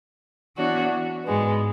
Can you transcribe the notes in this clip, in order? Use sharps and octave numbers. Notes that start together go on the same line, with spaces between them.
E3 B3 D4 F#4 C#5
G#2 G#3 B3